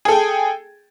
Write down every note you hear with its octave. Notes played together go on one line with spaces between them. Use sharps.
G#4 A4 G5